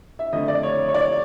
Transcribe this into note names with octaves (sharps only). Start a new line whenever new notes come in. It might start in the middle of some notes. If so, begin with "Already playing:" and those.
E5
F2 D3 F3 A3 D#5
D5
C#5
C#5
D5